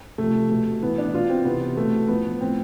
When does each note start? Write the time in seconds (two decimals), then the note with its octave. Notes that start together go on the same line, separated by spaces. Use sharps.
0.18 C3 F3 A3
0.50 B2 A3
0.82 A2 E3 B3
0.98 D4
1.13 B2 F4
1.29 C4
1.45 C3 E3 B3
1.77 B2 A3
2.08 A2 F3 B3
2.41 A2 F3 C4